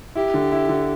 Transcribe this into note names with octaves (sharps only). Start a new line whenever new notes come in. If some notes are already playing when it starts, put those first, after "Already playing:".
E4 G4
D3
E4
D3